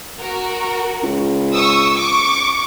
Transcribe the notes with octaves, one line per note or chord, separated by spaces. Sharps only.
F#4 A#4
C#2
C#6 D#6 E6
C#6 D6